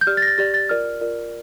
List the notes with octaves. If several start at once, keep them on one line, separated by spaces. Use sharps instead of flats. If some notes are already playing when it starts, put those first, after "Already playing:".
G6
G4 D5 F6
A6
A#6
A6
G4 D5 A6
A6
F4 A#4 D5 F6
F4 A#4 D5